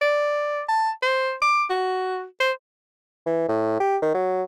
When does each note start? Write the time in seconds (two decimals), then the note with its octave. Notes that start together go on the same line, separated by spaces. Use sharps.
0.02 D5
0.69 A5
1.03 C5
1.42 D6
1.70 F#4
2.40 C5
3.26 E3
3.49 A2
3.80 G4
4.02 D#3
4.14 F#3